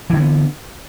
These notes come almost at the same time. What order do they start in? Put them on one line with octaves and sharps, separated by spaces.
E3 D3 A#3 B3